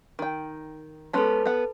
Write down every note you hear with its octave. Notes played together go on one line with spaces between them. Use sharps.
D#3 G5
G#3 B3 C#4 A4 B4 A5
B3 F#5